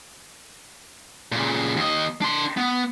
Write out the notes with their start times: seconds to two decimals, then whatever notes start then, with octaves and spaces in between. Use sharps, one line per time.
1.32 A#2 C#3
1.77 D#2 D#5
2.22 D4 C6
2.57 B3